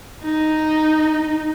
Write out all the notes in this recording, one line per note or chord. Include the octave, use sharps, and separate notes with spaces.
D#4